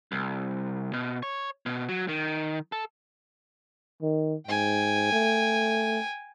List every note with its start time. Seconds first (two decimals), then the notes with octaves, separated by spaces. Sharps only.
0.12 C2
0.93 B2
1.23 C#5
1.66 B2
1.88 F#3
2.08 D#3
2.72 A4
4.02 D#3
4.48 G#2 G5 G#5
5.12 A3